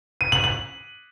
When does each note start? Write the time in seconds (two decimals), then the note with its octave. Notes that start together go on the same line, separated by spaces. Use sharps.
0.21 D#7
0.32 F#7
0.44 F#7